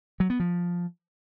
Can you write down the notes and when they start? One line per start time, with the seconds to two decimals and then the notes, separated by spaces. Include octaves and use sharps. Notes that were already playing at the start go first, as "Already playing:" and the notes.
0.20 F#3
0.30 B3
0.40 F3